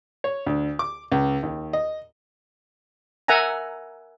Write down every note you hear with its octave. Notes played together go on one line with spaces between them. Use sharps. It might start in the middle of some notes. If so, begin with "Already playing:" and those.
C#5
D2
D6
C#2
D#2
D#5
A#4 E5 F#5 G#5 A#5